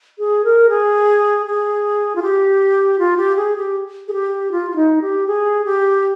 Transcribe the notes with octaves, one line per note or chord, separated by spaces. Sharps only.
G#4
A#4
G#4
G#4
F4
G4
F4
G4
G#4
G4
G#4
G4
F4
F4
D#4
G4
G#4
G4